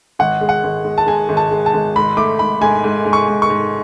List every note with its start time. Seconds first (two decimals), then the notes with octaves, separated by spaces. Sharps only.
0.19 G#1 F#5
0.41 G#3
0.49 F#5
0.64 G#1
0.85 G#3
0.98 A5
1.07 G#3 G#5
1.29 G#1
1.37 A5
1.51 G#3
1.66 A5
1.74 G#1
1.96 G#2 B5
2.17 A3 D6
2.39 G#2 B5
2.61 G#2 G#5
2.84 G#2
3.05 G#2
3.13 C#6
3.28 G#2
3.42 C#6
3.50 G#2